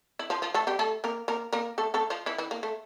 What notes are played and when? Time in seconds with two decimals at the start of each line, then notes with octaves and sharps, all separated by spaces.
0.19 E4
0.30 F3 F4
0.42 F3 F4
0.54 A3 A4
0.67 G3 G4
0.79 A3 A4
1.04 A#3 A#4
1.28 A#3 A#4
1.53 A#3 A#4
1.78 A3 A4
1.94 A3 A4
2.10 F3 F4
2.26 E3 E4
2.38 E3 E4
2.51 A#3
2.63 A3